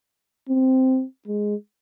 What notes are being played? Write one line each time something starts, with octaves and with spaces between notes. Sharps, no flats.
C4
G#3